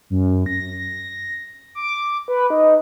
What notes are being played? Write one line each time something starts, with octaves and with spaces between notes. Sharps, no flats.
F#2
A#6
D6
B4
D#4